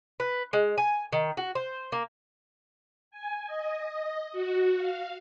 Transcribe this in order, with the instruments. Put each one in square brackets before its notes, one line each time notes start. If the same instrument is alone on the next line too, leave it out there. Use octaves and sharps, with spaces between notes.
[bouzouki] B4
G#3
G#5
D#3
F#4
C5
A#3
[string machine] G#5
D#5
F#4
F5